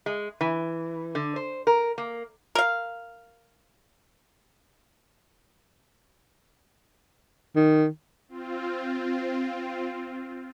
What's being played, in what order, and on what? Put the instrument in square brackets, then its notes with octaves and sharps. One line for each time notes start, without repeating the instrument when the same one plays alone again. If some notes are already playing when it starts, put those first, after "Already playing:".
[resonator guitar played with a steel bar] G#3
E3
D3
C5
A#4
A#3
[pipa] A#4 F5
[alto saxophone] D#3
[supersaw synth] C4 F4